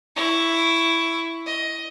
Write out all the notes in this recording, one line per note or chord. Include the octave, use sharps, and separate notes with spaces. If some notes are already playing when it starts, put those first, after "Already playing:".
E4 C#6
D#5